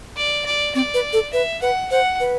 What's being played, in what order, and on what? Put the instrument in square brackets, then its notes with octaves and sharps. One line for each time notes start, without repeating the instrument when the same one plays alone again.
[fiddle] D5
D5
[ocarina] C4 [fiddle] D5
[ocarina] B4
A4
[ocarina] B4 [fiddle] E5
[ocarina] B4 [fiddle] F#5
[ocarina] C5 [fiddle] F#5
[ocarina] B4